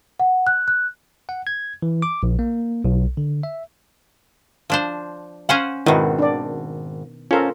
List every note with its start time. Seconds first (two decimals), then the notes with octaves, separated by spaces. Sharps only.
0.19 F#5
0.47 F#6
0.68 F#6
1.29 F#5
1.47 G#6
1.82 E3
2.02 D6
2.23 A#1
2.39 A#3
2.84 B1
3.17 D3
3.43 E5
4.70 F3 D4 C5
5.49 C#4 C5 F5 F#5 G#5
5.86 G#1 B2 D#3 E4 B4
6.18 D4 D5
7.31 C#4 F4 A4 A#4 C5